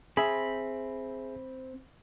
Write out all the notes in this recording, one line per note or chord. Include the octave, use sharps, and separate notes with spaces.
C4 G#4 E5 B5